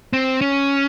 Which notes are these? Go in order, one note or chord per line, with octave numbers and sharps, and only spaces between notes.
C4
C#4